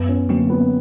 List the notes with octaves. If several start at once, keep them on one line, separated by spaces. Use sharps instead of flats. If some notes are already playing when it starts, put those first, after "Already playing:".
Already playing: F#2 B3
C#4
D3 F#3 A#3 C4 C#4
B3